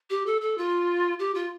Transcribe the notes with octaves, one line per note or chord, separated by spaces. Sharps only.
G4
A4
A4
F4
G4
F4